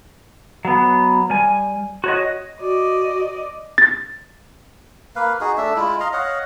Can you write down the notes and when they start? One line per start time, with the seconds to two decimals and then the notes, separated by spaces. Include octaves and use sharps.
0.65 F#3 B3
1.30 G3 G#5
2.04 F#4 C#5 D#5
2.61 F#4 D5 D#5
3.78 A6
5.16 A#3 B4 F5
5.41 D#4 F#4 G#4
5.58 A3 D4 E5
5.76 G#3 E4 F4
6.00 D#5 F5 A#5 C6
6.13 C#5 D#5 F5 F#5